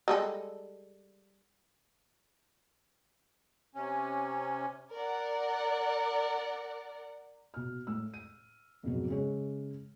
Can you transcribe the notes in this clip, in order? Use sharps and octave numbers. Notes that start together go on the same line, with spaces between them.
G3 G#3 A4
C3 C#4
A#4 D5 F#5
B2 F6
A2 E6
D#7
F2 G#2 B2 F#3
C#3 G#3 C#5